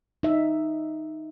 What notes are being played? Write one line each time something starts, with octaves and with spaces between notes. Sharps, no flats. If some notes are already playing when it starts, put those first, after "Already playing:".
D#4 E5